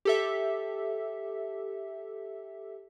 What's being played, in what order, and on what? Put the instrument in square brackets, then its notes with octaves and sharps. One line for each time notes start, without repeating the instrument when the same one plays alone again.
[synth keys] G4 A4 E5